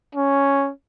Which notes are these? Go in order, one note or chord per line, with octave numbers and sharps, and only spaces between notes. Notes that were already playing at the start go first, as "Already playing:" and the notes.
C#4